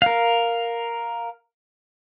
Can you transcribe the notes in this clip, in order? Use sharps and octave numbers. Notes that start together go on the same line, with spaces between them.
A#4 F5